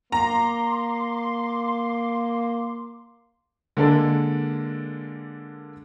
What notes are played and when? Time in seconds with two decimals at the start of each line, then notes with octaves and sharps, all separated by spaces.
0.12 A#3 A#5 C6 D6
3.77 D3 G#3 A#3 D4 A4 A#4